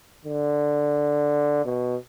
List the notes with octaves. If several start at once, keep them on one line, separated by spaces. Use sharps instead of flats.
D3
B2